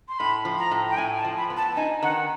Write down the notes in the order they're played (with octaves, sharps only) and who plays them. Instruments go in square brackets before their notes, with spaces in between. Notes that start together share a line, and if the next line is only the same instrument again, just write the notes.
[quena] C6
[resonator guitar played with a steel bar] A2 [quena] B5
[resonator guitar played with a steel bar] F3
[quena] A#5
[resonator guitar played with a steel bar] A2
[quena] G5
[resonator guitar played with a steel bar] A2 [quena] G#5
[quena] A5
[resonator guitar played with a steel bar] F3
[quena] B5
[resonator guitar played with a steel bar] B3
[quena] A5
[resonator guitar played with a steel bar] D#4 [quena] G#5
[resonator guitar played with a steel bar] D#3 [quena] F#5